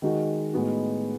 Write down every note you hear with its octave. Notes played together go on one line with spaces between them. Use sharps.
D#3 G#3 D#4 F#4
A2 G#3 B3 D#4 F#4